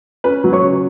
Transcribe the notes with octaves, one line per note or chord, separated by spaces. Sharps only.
C#4 B4 B5
F#3
C#5 C#6
C#3